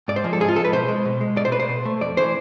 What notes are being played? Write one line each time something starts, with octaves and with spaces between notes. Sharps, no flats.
G#2 D5
C5
F3 G#3
A4
G#2 G#4
F4
F3 G#3 A4
B4
B2 C5
G#3
B2
G#3
B2 D5
C5
A3 B4
C5
B2
A3
F2 D5
E3 A3 C5